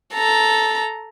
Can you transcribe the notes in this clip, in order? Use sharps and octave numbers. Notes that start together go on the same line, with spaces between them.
A4 A#5